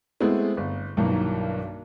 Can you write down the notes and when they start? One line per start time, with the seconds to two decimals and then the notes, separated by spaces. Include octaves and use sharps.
0.21 G#3 A3 B3 C4 E4
0.57 G1
0.97 B1 G2 D#3 E3 F#3 A#3